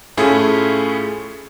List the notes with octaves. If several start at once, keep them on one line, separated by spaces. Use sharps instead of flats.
A2 A3 C#4 E4 F4 G#4